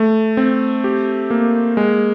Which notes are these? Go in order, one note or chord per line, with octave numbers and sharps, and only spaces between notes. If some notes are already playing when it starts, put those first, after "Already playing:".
Already playing: A3
C4
G4
A#3
G#3